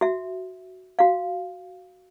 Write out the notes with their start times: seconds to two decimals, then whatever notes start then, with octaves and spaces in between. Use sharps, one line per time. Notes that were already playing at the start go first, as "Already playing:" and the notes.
0.01 F#4 E5
0.99 F#4 F5